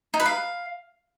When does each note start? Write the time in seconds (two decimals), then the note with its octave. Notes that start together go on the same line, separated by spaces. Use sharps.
0.14 D#4
0.20 B4
0.26 F5